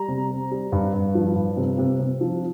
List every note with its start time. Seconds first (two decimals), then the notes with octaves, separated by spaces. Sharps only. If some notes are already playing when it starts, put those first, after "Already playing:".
Already playing: G3 A#5
0.08 C3
0.30 C4
0.51 G3
0.72 G2
0.94 G2
1.15 F3
1.36 G2
1.57 C3
1.78 C3
2.00 C3
2.21 F3